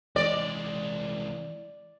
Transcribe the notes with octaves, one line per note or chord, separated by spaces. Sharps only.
C2 E3 G#3 D5 D#5